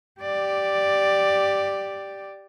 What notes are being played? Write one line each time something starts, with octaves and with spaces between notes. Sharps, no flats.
G4 D5